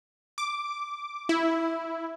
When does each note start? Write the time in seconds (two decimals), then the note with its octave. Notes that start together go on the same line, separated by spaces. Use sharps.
0.38 D6
1.29 E4